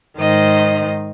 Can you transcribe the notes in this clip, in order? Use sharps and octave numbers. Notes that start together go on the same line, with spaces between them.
G#2 D#3 C5 D#5